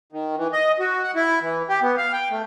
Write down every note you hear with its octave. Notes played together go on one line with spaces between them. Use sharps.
D#3
E3
D#5
F#4
F#5
E4
E3
G4
B3
F5
G5
A3